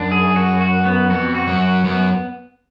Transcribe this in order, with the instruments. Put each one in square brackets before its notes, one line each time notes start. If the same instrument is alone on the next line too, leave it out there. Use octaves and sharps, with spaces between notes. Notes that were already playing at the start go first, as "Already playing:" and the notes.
Already playing: [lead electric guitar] F#2 [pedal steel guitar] D4
[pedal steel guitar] G#4
F#4
F#4
B3
[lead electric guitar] F2 [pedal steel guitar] F#4
[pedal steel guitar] F#4
[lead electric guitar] F#2
[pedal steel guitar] F#4
[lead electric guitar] F#2 [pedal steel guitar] B3